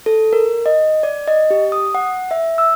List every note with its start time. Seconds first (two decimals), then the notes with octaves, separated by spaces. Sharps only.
0.06 A4
0.33 A#4
0.66 D#5
1.03 D5
1.27 D#5
1.51 G4
1.72 D#6
1.95 F#5
2.31 E5
2.58 E6